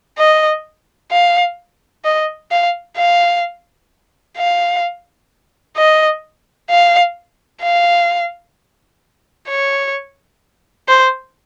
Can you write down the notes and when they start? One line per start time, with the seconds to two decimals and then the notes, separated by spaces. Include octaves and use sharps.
0.18 D#5
1.11 F5
2.04 D#5
2.51 F5
2.97 F5
4.38 F5
5.77 D#5
6.70 F5
7.62 F5
9.49 C#5
10.88 C5